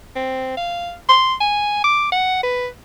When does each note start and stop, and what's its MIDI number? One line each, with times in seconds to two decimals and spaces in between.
0.16 0.55 60
0.57 0.94 77
1.09 1.35 84
1.41 1.82 80
1.84 2.09 86
2.12 2.41 78
2.43 2.68 71